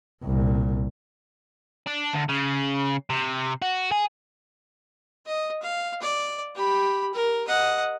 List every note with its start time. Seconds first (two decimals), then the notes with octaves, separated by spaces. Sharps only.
0.25 C2 A#2
1.87 D4
2.14 D2
2.29 C#3
3.10 C3
3.62 F#4
3.91 G#4
5.26 D#5
5.62 F5
6.02 D5
6.55 G4 B5
7.14 A#4
7.48 D#5 F#5